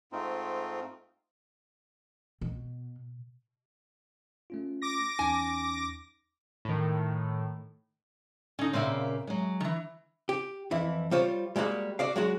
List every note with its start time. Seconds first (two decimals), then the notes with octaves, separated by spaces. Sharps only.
0.12 G#2 A3 C4 D#4 F4
2.41 B2
4.50 A3 C#4 F4
4.82 D6 A#6
5.19 E2 C#4 D#4 G#5
6.65 A2 D#3
8.59 D3 C#4 D#4
8.73 A#2 C#3 A#3 C4 E5
9.27 F#3 G#3
9.60 D#3 E3
10.29 G4
10.71 F2 E3 E4
11.11 G3 F4 C5 C#5
11.56 G3 G#3 A#3 F#4
11.99 F#4 D5 F5
12.16 F#3 G#3 F#4